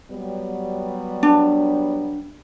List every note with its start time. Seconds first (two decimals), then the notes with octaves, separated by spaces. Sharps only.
0.11 F#3 G3 B3
1.23 D4